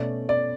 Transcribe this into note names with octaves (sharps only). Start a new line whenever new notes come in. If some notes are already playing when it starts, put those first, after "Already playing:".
Already playing: B2 A3 C#4 D5
D5